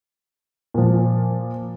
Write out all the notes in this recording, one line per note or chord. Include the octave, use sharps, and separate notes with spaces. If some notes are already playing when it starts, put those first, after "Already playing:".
A#2 F3